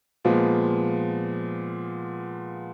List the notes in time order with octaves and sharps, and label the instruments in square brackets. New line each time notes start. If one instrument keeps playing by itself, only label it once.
[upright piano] A#2 F3 G#3 B3